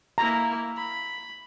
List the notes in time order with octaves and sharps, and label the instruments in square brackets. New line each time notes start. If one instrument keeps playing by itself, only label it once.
[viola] A#3 E4 [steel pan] A#5
[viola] B5